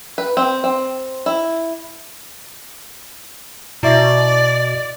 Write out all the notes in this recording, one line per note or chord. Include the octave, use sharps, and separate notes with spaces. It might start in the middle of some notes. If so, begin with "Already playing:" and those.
B4
C4
C4
E4
B2 E4 D5 E5